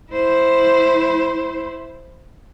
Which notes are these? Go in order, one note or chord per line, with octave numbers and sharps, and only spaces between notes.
E4 C5